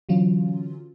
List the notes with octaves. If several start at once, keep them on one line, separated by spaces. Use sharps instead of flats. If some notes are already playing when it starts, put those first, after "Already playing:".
D3 E3 F#3 C#4 F4